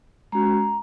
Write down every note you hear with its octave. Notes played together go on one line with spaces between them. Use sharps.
G#3 C#4 F#4 A#5